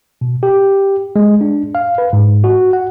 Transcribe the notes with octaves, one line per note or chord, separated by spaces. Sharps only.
B2
G4
G#3
D4
F5
B4
G#2
F#4
F#5